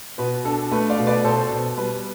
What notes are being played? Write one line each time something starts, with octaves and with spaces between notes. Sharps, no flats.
B2 B4
D4 A4
A3 B4
D5 F5
B2
B4 D5
B2 A4 C5
B2
G3 B4